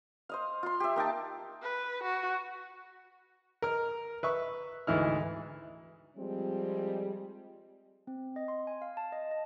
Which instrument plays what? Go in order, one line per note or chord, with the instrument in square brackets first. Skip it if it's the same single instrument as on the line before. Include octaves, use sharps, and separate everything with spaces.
[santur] C5 D#5 F5
F4 C6
G4 E5
A#3 D#4 G5 A5
[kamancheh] B4
F#4
[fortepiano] A#4 F6
B4 E5 C#6
D2 G#2 E3 E4 F6
[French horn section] F3 G3 G#3 C4
[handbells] C4
D#5
C6
G#5
F5
A5
D#5
D#5